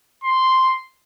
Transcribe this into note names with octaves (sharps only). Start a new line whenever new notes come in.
C6